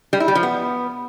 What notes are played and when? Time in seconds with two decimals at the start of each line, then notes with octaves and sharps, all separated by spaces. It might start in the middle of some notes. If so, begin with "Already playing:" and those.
0.13 G3
0.20 E4
0.28 G3
0.35 F3
0.43 B3